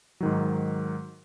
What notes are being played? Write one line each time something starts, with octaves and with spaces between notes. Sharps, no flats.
G#2 D#3 F#3